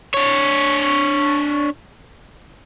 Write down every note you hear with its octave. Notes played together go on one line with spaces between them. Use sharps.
D4 C#5